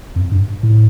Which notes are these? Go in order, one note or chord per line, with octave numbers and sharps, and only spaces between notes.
F2
G2
A2